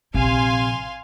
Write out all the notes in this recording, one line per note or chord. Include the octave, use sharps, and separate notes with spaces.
A#1 C3 F5 G#5 C6